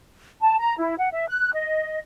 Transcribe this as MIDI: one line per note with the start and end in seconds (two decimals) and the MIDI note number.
0.41 0.56 81
0.59 0.76 82
0.78 0.95 64
0.98 1.11 78
1.12 1.27 76
1.28 1.53 90
1.53 1.99 75